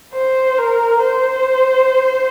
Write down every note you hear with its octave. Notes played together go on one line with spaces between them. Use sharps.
C5
A#4
C5